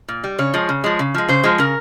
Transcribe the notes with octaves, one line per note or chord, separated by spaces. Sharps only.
A#2
G3
C#3 C#5
F3 G#3
C#3
F3 G#3
C#3
F3 G#3
C#3 C5
F3 G#3
C#3 A#4